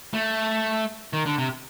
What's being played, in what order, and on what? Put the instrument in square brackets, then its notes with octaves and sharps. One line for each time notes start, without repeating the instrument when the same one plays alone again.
[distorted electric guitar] A3
D#3
D3
C3